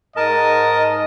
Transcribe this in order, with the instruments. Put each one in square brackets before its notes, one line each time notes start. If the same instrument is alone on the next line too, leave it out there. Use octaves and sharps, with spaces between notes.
[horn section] G#2 D#5 [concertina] A#4 A5